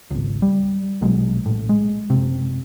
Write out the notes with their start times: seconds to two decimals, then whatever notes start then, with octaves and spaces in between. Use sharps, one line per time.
0.11 G#1 C#2
0.42 G3
1.01 A#1 B2 F#3 G#3
1.46 A#1 A2
1.69 G#3
2.10 F#1 C3